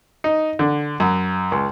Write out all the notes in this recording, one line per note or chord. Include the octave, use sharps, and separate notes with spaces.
D#4
D3
F#2
C#2